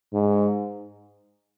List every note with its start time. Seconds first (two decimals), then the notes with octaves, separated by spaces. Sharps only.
0.13 G#2